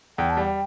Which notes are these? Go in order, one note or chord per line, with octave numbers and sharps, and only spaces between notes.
E2 G5
A5
G3 G5